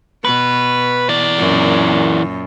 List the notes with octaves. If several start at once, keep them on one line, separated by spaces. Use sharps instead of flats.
B2 B4
E3 D5
F#2 A#2